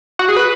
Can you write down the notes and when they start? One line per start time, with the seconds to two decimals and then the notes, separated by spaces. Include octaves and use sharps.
0.19 F#4
0.29 G#4
0.36 B4